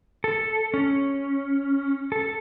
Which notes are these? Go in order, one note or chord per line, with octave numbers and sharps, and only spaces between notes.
A4
C#4
A4